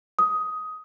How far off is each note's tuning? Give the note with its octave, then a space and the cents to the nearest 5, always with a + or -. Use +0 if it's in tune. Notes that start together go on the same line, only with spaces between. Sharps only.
D#6 +10